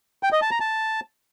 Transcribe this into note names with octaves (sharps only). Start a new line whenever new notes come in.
G5
D#5
A5
A#5
A5